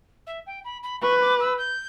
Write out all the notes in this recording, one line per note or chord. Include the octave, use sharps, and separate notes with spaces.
E5
G5
B5
B5
B4 C#6
D6
E6
G6